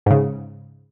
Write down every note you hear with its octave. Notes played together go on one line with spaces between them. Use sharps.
G#2 C#3